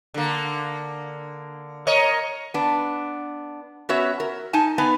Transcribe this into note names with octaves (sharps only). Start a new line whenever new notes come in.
D3 A#3
A#4 C#5 D#5
B3 D4
B3 C#4 F#4 B4 C#5 E5
A#4
D#4 G#5 A5
B3 D#4 B4 G#5